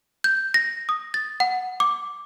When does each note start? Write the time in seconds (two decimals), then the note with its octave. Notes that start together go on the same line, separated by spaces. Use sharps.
0.24 G6
0.54 A#6
0.89 D#6
1.14 A6
1.40 F#5
1.80 D6